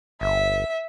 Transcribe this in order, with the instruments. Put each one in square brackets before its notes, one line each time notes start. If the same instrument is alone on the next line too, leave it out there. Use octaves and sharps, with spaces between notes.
[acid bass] G1 [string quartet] E5